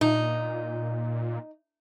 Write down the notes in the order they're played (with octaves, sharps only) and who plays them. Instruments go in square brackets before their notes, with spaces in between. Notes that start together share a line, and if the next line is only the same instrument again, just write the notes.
[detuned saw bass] A#2 [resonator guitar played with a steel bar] D#4